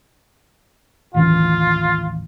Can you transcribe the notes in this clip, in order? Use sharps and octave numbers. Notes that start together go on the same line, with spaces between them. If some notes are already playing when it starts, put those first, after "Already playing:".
A1 D#2 E3 F4